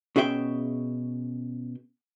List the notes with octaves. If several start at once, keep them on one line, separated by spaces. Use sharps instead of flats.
B2 C#4 G#4 E5 G5